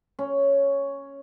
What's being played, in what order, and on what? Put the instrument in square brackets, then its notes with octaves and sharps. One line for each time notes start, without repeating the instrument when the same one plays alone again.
[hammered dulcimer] C#4